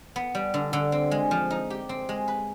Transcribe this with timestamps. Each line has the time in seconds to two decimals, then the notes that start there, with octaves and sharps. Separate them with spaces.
0.16 B3
0.35 G3
0.54 D3
0.73 D3
0.92 C4
1.11 G#3
1.31 F3
1.50 D#4
1.70 G4
1.89 C4
2.09 G#3
2.28 B4